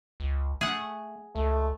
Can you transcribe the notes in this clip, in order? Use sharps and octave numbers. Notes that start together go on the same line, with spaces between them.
C#2
A3 G#4 F#5
C#2 A3